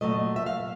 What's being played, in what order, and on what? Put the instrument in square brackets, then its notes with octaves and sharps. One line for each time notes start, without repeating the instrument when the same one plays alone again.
[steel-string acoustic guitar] A#2 F#3 A3 D#5
E5
F5